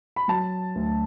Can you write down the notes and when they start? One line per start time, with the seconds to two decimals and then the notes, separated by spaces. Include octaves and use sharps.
0.16 B5
0.28 F#3 A5
0.75 D2